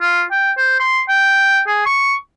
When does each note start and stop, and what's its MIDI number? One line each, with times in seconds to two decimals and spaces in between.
0.01 0.23 65
0.31 0.52 79
0.57 0.75 72
0.80 1.01 84
1.08 1.61 79
1.68 1.82 68
1.86 2.15 85